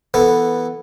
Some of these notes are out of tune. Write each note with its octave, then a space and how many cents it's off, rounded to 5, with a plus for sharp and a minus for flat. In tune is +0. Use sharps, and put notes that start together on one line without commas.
E3 +0 B3 -5 A4 +0